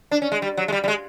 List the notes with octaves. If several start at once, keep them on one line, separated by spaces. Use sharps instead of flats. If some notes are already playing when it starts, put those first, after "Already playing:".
D4
C#4
G#3
G3
F#3
G#3
G3
G3
G#3